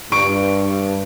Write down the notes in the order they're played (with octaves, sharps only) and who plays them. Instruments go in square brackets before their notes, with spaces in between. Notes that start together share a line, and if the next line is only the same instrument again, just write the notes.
[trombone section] G2 [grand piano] C#6 D7